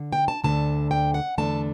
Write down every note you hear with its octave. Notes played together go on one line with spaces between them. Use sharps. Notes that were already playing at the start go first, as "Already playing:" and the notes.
Already playing: D3
G5
A5
D2 D3 A3 A5
G5
F#5
E2 D3 A3 D4 A5